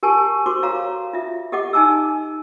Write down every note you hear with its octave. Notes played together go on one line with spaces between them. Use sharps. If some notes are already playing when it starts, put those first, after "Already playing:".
G4 A#4 G#5 A5 C#6
F#4 A#4 C5 C6 D6
F#4 A4 C#5 F5 A#5
F4 E5
G4 A4 D#5 F#5 D6
D#4 G#5 A5 D6 E6